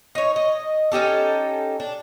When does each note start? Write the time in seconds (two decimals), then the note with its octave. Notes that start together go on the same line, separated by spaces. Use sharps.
0.15 D#4 C#5
0.36 D#5
0.92 C#4 D#4 G4 A4
1.80 D4